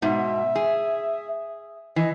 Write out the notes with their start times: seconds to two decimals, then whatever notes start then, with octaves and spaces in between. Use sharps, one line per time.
0.02 G#2 B2 E5
0.55 G#4
1.96 E3 D#5